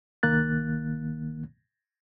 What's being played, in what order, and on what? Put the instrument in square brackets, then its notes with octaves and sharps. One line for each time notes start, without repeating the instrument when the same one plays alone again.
[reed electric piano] C2 D#3 A#3 F#6 A6